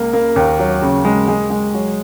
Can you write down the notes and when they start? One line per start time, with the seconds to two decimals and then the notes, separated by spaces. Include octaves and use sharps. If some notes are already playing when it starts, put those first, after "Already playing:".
Already playing: C#2 A#3
0.13 A#3
0.36 D#2
0.59 F#3
0.82 C#3
1.05 G#3
1.28 G#3
1.50 G#3
1.74 F#3